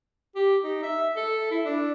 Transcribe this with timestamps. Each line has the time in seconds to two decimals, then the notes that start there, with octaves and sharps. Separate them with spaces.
0.36 G4
0.64 D#4
0.83 E5
1.17 A4
1.51 E4
1.66 D4